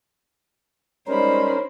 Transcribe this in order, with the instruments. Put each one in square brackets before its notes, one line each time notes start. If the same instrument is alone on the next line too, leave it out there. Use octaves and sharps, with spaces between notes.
[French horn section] G3 G#3 D5 [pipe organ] C#4 A#4 [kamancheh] D#4 B5 [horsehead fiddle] C5